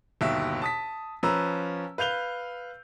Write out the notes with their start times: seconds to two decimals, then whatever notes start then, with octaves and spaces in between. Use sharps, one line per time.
0.21 G1 D#2 B2 E5
0.62 A5 D#6 B6
1.23 F3 C#4 B4 A#5 E6
1.98 B4 F5 G6 F7 G7